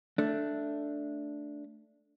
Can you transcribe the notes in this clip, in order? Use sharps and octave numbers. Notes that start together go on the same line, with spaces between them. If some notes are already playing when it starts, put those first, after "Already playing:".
A3 D4